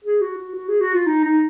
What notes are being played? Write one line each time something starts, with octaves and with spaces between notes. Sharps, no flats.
G#4
F#4
F#4
F#4
G#4
F#4
F4
D#4
D#4